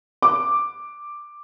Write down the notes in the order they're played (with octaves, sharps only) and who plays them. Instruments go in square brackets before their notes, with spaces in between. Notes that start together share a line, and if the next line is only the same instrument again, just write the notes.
[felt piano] D6